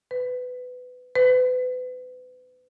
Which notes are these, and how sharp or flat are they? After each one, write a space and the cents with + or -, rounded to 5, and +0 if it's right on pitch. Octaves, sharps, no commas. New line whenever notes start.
B4 +20
B4 +35